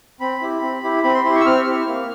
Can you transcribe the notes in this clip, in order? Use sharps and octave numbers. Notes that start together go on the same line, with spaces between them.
C4 B5
E4 G4
C4
E4 G4
C4 B5
C6
E4 G4 C6
C#6
E6
C4 F6
E4 G4
A#3